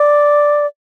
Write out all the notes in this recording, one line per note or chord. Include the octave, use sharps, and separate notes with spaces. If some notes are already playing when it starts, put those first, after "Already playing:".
Already playing: D5